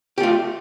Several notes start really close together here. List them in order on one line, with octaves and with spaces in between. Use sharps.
G4 A3 F4